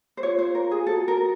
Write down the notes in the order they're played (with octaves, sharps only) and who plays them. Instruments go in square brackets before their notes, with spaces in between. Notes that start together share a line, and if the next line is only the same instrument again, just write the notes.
[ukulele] C5
[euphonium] F4 [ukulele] C#5
[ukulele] C5
A#4
G#4
[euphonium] F#4 [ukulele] A4
[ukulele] A#4